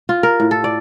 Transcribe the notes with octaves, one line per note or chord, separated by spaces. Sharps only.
F4
A#4
A2
A4
D5